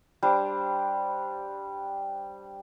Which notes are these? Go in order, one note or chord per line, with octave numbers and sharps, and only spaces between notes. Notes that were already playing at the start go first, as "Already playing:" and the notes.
G3 D4 C5